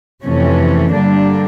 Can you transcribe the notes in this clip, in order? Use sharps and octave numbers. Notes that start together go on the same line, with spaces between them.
F2 C3 E3 A3 C#4
G2 D3 G3 A#3 D4